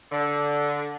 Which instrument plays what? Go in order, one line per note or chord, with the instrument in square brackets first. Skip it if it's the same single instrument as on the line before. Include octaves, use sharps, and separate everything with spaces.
[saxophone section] D3